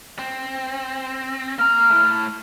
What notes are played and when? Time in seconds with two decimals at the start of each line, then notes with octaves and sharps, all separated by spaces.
0.19 C4
1.59 A#3 A#5 F6
1.90 A3 E4